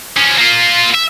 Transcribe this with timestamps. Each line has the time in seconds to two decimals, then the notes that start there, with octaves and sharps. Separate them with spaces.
0.17 F3 C#4
0.38 A#3 F4
0.94 E5